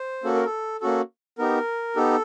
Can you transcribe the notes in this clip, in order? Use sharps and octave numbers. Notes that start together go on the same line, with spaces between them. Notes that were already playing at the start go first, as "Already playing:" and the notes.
Already playing: C5
A#3 C#4 F#4 A4
A#4
A4
A#3 C#4 F#4 A4
B3 D#4 G4 A#4
B3 D#4 G4 A4